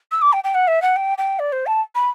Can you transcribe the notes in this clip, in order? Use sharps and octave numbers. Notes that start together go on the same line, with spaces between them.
E6
D6
G5
G5
F#5
E5
F#5
G5
G5
D5
C5
A5
B5